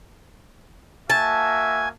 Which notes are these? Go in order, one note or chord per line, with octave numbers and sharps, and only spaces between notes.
A#3 F#4 E5 G#5 A5